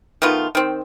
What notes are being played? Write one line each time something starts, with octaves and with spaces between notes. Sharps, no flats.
D#3 A3 B3 F4
D#3 C4